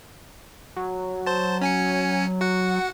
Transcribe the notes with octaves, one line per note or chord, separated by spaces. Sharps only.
F#3
C5 A5
C#4 G#5 C#7
F#4 F#5